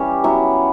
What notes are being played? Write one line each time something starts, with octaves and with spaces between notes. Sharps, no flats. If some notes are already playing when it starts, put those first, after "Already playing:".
Already playing: E3 G3 C#4 G4
F#3 B3 E4